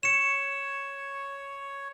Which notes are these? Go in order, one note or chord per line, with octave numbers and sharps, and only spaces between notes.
C#5 C#7 E7